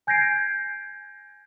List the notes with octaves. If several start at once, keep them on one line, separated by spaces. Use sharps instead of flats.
G#5 G6 G#6 A#6 C7 D7